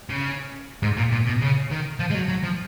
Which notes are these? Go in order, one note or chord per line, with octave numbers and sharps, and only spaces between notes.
C#3
G#2
A#2
A#2
B2
C#3
D#3
F3
G#3
F#3
F#3
F3